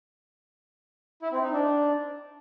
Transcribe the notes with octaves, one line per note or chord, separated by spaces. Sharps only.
E4
C4
D#4
D4